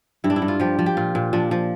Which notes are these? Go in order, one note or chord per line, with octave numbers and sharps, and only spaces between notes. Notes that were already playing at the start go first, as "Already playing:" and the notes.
G2 E4
D4
E4
G2
F4
F3 G4
F3
G4
A#2 F4
A#2
F3 D4
F3